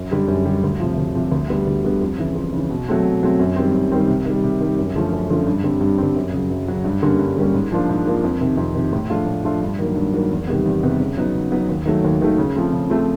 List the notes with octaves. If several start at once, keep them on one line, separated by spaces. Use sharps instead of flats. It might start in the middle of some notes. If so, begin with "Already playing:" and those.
Already playing: F#2
D3 G3
F#2
D3 G3
D2
C3 F3
D2
C3 F3
D2
D3 G3 B3
D2
D3 G3 B3
F2
C#3 E3
F2
C#3 E3
B2
F#3 A3 C4
B2
F#3 A3 C4
F#2
D#3 G3 C4
F#2
D#3 G3 C4
C3
D#3 G3
C3
D#3 G3
F#2
D3 F3 A3 C#4
F#2
D3 F3 A3 C#4
G2
D3 G3 C4
G2
D3 G3 C4
F#2
C#3 F#3
F#2
C#3 F#3
G2
D3 G3 A#3 C#4
G2
D3 G3 A#3 C#4
G#2
F3 A#3 D4 F4
G#2
F3 A#3 D4 F4
F2
C3 D#3
F2
C3 D#3
A2
F3 A3 D4 F4
A2
F3 A3 D4 F4
G2
D#3 F#3 A#3
G2
D#3 F#3 A#3
E2
C3 D#3 G3 B3
E2
C3 D#3 G3 B3
C#3
F#3 B3 D#4
C#3
F#3 B3 D#4
D#2
D#3 F#3 A3
D#2
D#3 F#3 A3
C#3
F3 A3 C4
C#3
F3 A3 C4